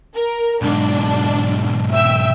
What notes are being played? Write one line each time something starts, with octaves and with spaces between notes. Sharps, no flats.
A#4
B1 G#2 D4
E5 G5 E6